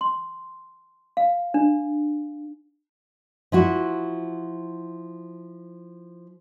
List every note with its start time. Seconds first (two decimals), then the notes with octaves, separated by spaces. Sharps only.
0.01 C6
1.17 F5
1.54 D4
3.52 F3 E4 F#4